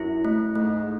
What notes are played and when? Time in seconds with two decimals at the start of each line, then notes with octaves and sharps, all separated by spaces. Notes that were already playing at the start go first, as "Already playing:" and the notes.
Already playing: F#2 E4
0.25 A3
0.55 G#2 A3